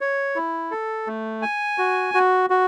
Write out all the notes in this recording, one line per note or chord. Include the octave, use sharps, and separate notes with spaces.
C#5
E4
A4
A3
G#5
F#4
F#4
F#4